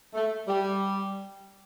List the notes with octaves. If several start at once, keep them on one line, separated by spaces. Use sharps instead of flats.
A3
G3